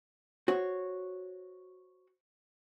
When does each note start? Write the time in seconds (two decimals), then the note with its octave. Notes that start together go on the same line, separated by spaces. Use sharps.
0.48 F#4 C5 C#5